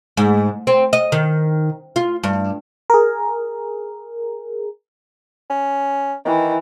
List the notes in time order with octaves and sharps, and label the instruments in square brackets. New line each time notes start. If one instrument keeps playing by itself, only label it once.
[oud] G#2
C4
D#5
D#3
F4
G2
[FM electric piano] G#4 A#4
[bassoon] C#4
[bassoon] D#3 [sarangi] E3